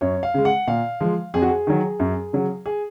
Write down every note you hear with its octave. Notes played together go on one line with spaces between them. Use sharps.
F#2 C#5
F5
C#3 G#3
F#5
A#2 F5
F3 G#3
F2 G#4
F#4
G#4
D#3 F#3
F#2
C#3 F#3
G#4